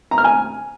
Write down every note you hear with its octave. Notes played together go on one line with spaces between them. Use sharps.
A#5
F6
G#5